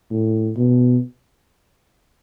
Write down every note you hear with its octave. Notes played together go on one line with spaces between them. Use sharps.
A2
B2